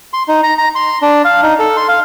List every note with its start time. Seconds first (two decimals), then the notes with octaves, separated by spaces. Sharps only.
0.13 C6
0.28 D#4
0.43 A#5
0.58 A#5
0.75 C6
1.02 D4
1.25 F5
1.43 D#4
1.59 A4
1.77 C6
1.89 F5